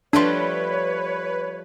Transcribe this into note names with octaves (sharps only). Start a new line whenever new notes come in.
F3 G3 A3 D4 B4 C#5 C6